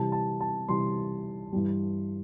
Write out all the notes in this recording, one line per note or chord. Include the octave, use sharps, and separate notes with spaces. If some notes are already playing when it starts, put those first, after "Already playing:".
Already playing: C3 E3 G3 A5
A5
A5
C3 E3 G3 C6
G2 E3 G3